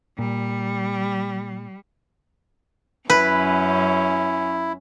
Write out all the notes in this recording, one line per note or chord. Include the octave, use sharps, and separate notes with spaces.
A#2 G3
F#2 C#4 E4 B4